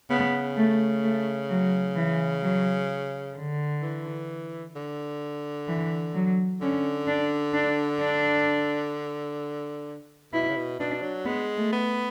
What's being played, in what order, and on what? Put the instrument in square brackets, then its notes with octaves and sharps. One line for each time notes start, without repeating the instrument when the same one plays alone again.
[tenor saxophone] C#3 [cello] B3
[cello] A3
A3
F#3
E3
F#3
D3
[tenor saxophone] E3
D3
[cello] E3
F#3
[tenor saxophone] D3 [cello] C#4
[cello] D4
D4
D4
[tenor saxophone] B2 [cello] E4
[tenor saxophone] C#3
B2
[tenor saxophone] B2 [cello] D4
[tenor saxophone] F#3
[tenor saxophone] G#3 [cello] B3
[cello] A3
[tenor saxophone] B3